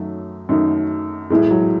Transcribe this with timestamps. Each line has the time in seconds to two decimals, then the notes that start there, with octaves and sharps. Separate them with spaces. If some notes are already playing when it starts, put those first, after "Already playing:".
Already playing: F#2 D#3 F#3 A3 D#4
0.49 F#2 D#3 A3 D#4
1.30 B1 A2 E3 G#3 A3
1.51 F#3